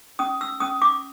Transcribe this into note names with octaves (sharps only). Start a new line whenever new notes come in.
C#4 D#6
E6
C#4 D#6
D6